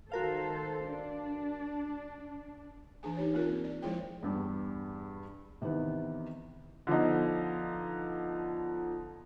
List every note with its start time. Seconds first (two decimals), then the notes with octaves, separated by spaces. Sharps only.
0.12 D#3 F#4 A4 A#4 C5 F5
0.87 D4
3.03 E3 D4 G#4 G#5
3.17 D#4 G4 C#5
3.34 A#3 C4 F4 A#4
3.64 D5
3.82 F3 G#3 E4 G#4 C5 G5
4.22 E2 G2 G3
5.62 C3 D#3 E3 B3
6.87 D3 F3 B3 D#4